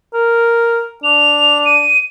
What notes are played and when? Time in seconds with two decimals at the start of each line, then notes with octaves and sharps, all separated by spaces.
0.13 A#4
1.03 D4 F7
1.65 D#7